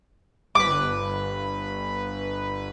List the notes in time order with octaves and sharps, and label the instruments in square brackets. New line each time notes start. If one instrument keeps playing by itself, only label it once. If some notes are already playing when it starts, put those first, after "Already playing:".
[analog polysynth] G1 B4 [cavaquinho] D6